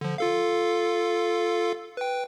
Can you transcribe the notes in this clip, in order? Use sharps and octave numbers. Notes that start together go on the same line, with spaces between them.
D3 F3
F4 A4 F5
B4 G5